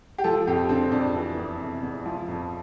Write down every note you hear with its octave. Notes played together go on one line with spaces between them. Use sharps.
G4
F3 A4
F2 G4
D3 C4
F2 D4
E3
E2
C3
E2
F3
F2